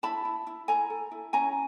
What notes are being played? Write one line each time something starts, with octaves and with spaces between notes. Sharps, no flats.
E4 A5 B5
E4
E4
A4 G#5 A#5
A4
E4
C#4 G#5 A#5